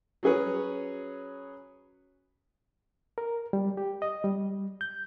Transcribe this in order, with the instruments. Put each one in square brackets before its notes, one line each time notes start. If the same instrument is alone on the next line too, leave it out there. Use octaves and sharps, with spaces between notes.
[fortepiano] F#3 C#4 G#4 B4 C#5
[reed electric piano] A#4
G3
G4
D#5
G3
G6